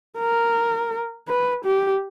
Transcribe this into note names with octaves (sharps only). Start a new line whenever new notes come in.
A#4
B4
G4